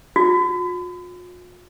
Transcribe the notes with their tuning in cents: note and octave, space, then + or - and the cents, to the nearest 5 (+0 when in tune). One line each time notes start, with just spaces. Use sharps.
F4 +45